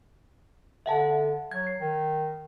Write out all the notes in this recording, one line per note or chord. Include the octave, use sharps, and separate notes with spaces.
D3 E5 F#5 A5
F#3 G#6
C7
D#3